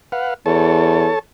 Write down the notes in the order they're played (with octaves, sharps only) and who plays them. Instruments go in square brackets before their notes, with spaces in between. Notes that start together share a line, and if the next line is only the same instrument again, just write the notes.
[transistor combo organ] B4 F5 F#5
[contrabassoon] E2 [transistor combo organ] A4 C#5 A5